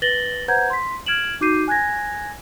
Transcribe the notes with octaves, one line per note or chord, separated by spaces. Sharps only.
B4 A6 A#6 F#7 G7
B4 C5 F#5 A#5 G6 G#6
C6 B6
F6 G#6 D7 E7 F#7
D#4 F#4 D6 G6 C7 D#7
G#5 F#6 G#6 A#6